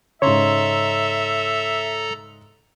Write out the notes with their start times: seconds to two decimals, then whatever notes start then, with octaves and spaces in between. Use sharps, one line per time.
0.22 G#2 C#3 A4 C#5 E5 A#5 C6